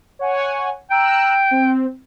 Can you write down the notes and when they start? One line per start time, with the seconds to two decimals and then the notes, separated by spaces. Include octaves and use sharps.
0.19 C#5 F#5 G#5
0.91 G5 A#5 E6 F#6
1.51 C4